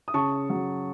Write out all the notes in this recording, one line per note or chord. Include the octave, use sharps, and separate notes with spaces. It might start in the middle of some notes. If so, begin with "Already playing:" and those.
D#6
C#3 A5 C#6
F#3